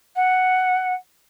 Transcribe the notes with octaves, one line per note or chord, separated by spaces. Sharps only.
F#5